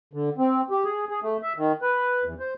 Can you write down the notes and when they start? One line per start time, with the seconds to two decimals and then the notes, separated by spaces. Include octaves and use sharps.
0.13 D3
0.38 C4
0.71 G4
0.84 G#4
1.09 G#4
1.22 A3
1.42 E5
1.57 D#3
1.82 B4
2.24 E2
2.40 C5